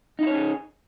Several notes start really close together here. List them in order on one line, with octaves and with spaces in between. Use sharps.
D#4 E4 C#5 C#4 G#4